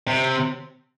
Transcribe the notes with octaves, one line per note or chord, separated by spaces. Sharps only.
C3